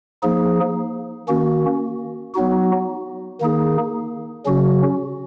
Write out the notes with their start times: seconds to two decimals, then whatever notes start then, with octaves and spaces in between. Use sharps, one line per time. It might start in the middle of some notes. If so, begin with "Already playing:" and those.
0.23 F3 A#3 D#4 G#4
1.29 D#3 A#3 C#4 F#4
2.34 F#3 B3 D#4 F#4
3.41 D#3 A#3 D#4 G#4
4.46 C#3 F#3 C#4 F#4